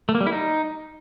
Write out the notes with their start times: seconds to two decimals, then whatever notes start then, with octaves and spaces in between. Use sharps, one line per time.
0.09 A3
0.15 A#3
0.21 G3
0.27 E4
0.32 D#4